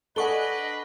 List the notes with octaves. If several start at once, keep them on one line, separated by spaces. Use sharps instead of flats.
D4 A4 B4 D#5 F#5 G#5 C#6 G7